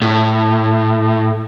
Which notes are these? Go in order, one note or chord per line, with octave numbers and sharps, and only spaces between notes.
A2